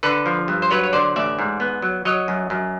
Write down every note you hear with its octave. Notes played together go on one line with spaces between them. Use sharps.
D3 A4 B4
F3
G2
C5
F#3 B4 C#5
C#5
D3 C5 D5
A1 D5 E5
G#2
B3
F#3
F#3 C#5 D#5
F#2
F#2